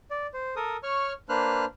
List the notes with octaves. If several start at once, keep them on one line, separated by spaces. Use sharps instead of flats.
D5
C5
A4 A#4 D#6
C#5 C#6 F6
A#3 D4 B4 C5 F6 F#6